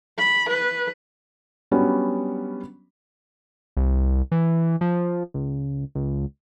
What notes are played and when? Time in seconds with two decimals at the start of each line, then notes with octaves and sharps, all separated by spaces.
0.18 B5
0.49 B4
1.71 F#3 G3 B3 C#4 D4
3.77 C2
4.32 E3
4.81 F3
5.34 C#2
5.95 C#2